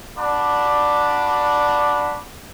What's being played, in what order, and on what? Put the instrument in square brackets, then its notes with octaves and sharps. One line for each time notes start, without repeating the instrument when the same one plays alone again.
[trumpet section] D4 F#4 D5 B5 D6